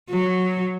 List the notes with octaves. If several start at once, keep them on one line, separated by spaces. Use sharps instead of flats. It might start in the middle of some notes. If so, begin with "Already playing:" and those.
F#3